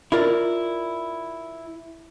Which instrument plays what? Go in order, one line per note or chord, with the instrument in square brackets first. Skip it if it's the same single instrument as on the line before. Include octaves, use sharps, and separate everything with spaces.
[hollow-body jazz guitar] E4 F4 A#4 D5